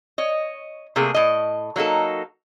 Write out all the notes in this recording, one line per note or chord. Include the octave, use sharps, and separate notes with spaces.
C#5 D#5
C3 A3 A#3 G#4
A2 D#5
F#3 A#3 D#4 A4